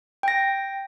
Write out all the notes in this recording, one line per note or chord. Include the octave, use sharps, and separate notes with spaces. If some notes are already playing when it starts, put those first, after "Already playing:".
G5 A#6